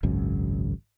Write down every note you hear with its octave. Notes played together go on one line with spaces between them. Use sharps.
G#1 C#2 F#2